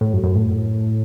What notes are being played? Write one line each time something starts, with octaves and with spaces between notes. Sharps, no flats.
A2
F#2
F#2
A2